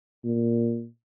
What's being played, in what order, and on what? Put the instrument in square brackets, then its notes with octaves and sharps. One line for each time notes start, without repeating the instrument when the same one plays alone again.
[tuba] A#2